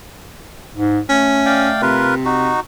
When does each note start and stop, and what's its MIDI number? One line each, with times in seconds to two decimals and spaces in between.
0.75 1.00 44
1.09 2.22 57
1.09 1.69 61
1.46 1.81 74
1.46 1.81 77
1.46 1.81 79
1.82 2.53 48
1.82 2.15 65
1.82 2.15 70
1.82 2.15 71
2.25 2.60 63
2.25 2.60 66